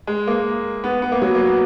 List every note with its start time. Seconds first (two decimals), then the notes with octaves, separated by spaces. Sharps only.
0.07 G#3
0.27 A#3
0.84 B3
1.02 B3
1.12 A#3
1.22 F#3
1.35 A#3
1.47 B3